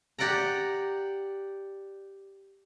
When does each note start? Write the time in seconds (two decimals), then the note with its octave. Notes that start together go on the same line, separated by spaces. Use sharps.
0.19 G4 D5 F#5 G5 A#5